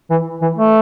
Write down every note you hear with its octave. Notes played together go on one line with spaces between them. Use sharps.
E3
E3
A3